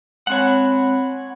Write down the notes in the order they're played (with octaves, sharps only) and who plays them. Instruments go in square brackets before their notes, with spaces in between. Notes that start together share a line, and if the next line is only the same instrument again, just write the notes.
[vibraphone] G#3 C4 B5 [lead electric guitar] C#5 F#5